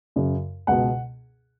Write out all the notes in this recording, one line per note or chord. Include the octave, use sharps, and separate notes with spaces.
F#2 C#3
C#2 B2 F#5